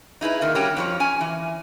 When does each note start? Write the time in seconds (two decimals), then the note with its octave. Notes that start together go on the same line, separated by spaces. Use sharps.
0.21 D#4 E4 G#4 B4
0.41 A#2 D#3 A#3
0.55 G3 A#3 C#4 D4 F#4 G4
0.77 F2 F3 C#5
1.00 C#4 G#5
1.21 E3